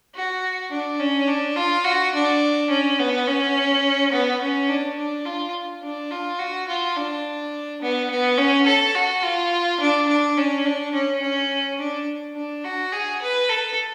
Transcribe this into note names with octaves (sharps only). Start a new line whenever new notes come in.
F#4
D4
C#4
D4
F4
F#4
D4
C#4
B3
C#4
B3
C#4
D4
D4
F4
D4
F4
F#4
F4
D4
B3
B3
C#4
A4
F#4
F4
D4
D4
C#4
D4
C#4
C#4
D4
D4
F#4
G#4
B4
A4